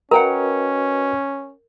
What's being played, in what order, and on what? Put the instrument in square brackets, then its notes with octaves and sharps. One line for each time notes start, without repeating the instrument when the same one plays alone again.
[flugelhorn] C#4 [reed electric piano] F#4 B4 D#5 [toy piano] A#4 [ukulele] F#5 G5 A#5